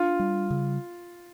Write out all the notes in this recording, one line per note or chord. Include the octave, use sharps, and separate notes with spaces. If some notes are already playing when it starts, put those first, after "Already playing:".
Already playing: D4 F4
G3
C#3